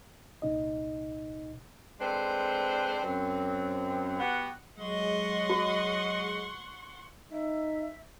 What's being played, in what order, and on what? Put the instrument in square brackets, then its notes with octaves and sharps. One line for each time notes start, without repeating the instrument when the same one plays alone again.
[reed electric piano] C2 A#2 D#4 D#5
[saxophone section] G#3 C4 D4 A4 B4 C5
F#2 C4
B3 F#4 G4 F#5
[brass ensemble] F#3 G#3 [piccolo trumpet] D#5 [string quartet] F#5 C6 C#6
[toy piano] F#4
[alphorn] D#4 [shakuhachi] E5